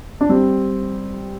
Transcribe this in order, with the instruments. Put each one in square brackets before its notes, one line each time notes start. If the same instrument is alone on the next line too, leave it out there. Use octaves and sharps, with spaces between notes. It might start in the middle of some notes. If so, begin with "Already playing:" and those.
[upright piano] D4
G3 C4